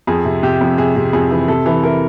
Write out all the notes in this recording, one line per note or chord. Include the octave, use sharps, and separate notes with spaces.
F2 G#4
C3
C3 G4
F2
C3 G#4
C3
F2 G#4
E3
C3 A4
E3
E3 A#4